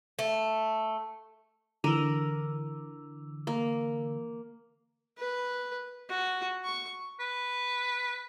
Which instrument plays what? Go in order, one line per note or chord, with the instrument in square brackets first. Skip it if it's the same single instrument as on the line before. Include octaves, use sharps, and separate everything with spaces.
[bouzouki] A3
[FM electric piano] D3 E3 [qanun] A#4
[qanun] A#3
[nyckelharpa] B4
F#4
C#6
[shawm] B4